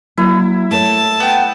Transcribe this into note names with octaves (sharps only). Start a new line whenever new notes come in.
F#3 A#3 E4
A3 A#4 C#5 A5
B3 G5